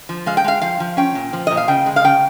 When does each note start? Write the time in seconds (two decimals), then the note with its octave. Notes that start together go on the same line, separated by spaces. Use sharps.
0.09 F3
0.26 G#3 F5
0.37 G5
0.44 G#3 F5
0.62 F3 F5
0.80 F3
0.97 C#4 G5
1.15 A#2
1.33 F3
1.47 A#2 D#5
1.57 F5
1.68 C#3 G5
1.86 G#3
1.96 F5
2.04 C#3 G5